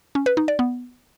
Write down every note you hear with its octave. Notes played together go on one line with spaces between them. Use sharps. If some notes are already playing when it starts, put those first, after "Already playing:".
C#4
B4
D#4
D5
B3